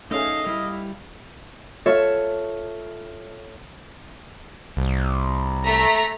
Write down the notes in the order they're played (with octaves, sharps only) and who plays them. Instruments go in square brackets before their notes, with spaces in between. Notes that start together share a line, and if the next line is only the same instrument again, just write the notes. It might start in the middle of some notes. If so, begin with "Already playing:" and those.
[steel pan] A3 C#4 G#4 [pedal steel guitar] D#4 A4 [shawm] D#5 [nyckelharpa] F5
[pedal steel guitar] G3 F5 [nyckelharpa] E4
[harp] F4 A4 C#5 E5
[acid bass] C2
[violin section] A3 A#5 B6